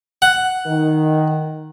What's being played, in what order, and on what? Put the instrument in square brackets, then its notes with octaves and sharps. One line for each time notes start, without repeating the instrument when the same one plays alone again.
[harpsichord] F#5
[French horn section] D#3